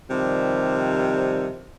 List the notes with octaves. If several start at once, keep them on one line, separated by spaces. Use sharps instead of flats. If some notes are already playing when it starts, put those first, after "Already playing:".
C3 D#3 F3 G3